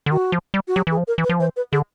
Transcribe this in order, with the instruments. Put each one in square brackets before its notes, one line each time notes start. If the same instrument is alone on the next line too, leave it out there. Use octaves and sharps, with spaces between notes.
[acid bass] D3
[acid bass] D#3 [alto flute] F#4
[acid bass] F3
G3
[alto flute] F#4
[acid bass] F#3 [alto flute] G4
[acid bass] E3 [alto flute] G#4
[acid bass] F3
[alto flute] A#4
[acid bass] E3
[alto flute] B4
[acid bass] F3
[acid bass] E3 [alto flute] C5
[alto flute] B4
[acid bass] D3 [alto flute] G#4